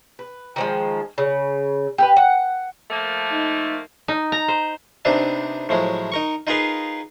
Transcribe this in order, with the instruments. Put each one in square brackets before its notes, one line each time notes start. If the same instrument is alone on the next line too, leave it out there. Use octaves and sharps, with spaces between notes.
[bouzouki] B4
D#3 F3 G#3
C#3
G4 A#4 B4
F#5
[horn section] F3 A3 A#3
[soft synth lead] D#4
[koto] D#4
A#5
C5
[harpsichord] C3 B3 C4 D4 D#4
A2 F3 F#3 G#3
D#4 A#4 C#6
D#4 F4 G#4 A#4 B4 F5